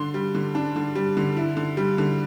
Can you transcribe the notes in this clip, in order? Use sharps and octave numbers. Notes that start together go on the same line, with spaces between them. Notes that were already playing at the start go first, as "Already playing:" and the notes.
Already playing: D3 D4 C6
G3
D3
D4
D3
G3
D3
E4
D3
G3
D3